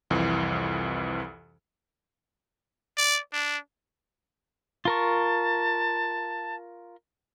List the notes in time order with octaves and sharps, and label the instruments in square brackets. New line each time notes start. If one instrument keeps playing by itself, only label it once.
[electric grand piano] C2 F2 E3
[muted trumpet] D5
D4
[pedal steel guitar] F4 A#4 C#6 [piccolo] A5